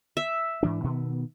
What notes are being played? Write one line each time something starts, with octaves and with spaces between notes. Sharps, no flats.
E5
G#2 E3 D4
B2 D#3 B3